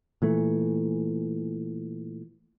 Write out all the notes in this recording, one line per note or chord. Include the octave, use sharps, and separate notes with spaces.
A#2 E3 A3